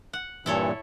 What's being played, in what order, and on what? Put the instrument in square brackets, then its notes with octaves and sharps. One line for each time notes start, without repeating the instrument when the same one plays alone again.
[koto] F#5
[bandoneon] G2 A#2 E3 [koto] E4 A4 C#5